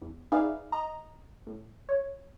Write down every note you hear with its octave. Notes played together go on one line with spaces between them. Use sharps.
E2
D#4 G#4 B4 D5 E5 F5
D#5 A#5
A2
C#5